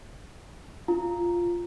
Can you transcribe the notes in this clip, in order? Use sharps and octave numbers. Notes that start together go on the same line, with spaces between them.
F4